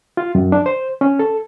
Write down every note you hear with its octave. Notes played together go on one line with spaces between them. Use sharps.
F4
F#2
D4
C5
C#4
A4